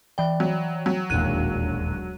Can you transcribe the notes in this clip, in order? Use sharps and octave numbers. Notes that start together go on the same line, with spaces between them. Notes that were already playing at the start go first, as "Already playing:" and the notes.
E3 D5 G5
F#3
F#3
E1 A#1 D#2 F#6 D#7